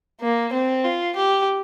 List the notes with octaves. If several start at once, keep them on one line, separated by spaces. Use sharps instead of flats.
A#3
C4
F4
G4